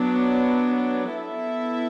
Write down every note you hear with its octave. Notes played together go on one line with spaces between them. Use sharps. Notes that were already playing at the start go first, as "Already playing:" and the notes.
Already playing: F#3 B3 D4
B3 E4 A4 E5